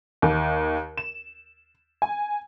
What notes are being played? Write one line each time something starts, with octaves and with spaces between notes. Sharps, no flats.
D#2
E7
G#5